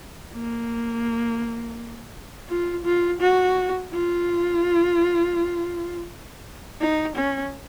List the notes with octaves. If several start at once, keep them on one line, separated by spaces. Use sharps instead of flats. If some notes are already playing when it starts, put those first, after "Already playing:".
A#3
F4
F4
F#4
F4
D#4
C#4